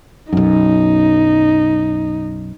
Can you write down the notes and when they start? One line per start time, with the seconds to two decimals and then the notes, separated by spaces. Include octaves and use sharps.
0.33 B1 F#2 D#4